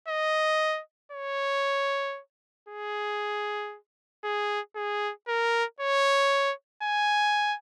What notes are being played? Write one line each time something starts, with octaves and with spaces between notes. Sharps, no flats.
D#5
C#5
G#4
G#4
G#4
A#4
C#5
G#5